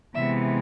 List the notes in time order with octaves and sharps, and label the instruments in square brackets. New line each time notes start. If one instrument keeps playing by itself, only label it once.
[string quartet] C3 E3 G#3 B3 E5